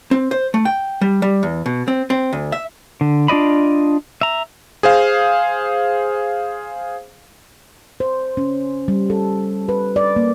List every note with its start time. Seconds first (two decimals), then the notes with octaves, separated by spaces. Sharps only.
0.11 C4
0.31 C5
0.54 A3
0.65 G5
1.01 G3
1.22 G3
1.43 E2
1.66 B2
1.88 C4
2.10 C4
2.33 D2
2.52 E5
3.01 D3
3.28 D4 F4 D5 D#5 B5
4.21 E5 A#5
4.83 G#4 C5 F5
8.00 C5
8.37 C#4
8.88 G3
9.10 A4
9.69 B4
9.96 D5
10.16 A#3